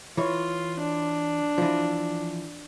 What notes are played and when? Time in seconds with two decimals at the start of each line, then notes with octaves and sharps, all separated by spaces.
0.17 E3 F4 C#5
0.81 D4
1.58 E3 F3